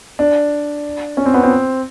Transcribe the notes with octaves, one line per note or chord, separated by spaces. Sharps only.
D4
C#4
C4
B3
C4